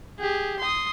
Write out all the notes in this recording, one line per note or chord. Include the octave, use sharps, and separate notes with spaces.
G4 G#4
C6 D#6